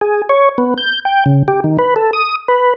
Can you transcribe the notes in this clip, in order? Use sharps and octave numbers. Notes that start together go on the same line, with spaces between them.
G#4
C#5
B3
G6
G5
C#3
G4
D#3
B4
A4
D#6
B4